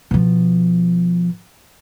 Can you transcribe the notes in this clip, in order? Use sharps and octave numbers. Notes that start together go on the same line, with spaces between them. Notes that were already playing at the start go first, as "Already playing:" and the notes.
B2 F3